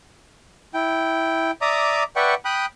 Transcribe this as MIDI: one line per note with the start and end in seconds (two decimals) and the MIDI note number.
0.74 1.51 64
0.74 1.51 79
1.62 2.03 74
1.62 2.03 76
1.62 2.03 82
1.62 2.03 86
1.62 2.03 87
2.16 2.34 71
2.16 2.34 74
2.16 2.34 76
2.16 2.34 78
2.16 2.34 79
2.16 2.34 85
2.45 2.66 79
2.45 2.66 83
2.45 2.66 87
2.45 2.66 90